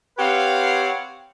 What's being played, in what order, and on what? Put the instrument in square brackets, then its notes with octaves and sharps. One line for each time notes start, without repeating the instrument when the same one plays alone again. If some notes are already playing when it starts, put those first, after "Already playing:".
[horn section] C4 G4 B4 C#5 F5 F#5